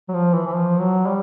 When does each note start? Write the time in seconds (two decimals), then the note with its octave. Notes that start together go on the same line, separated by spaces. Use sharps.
0.09 F#3
0.14 F3
0.34 E3
0.47 E3
0.54 F3
0.80 F#3
1.07 G3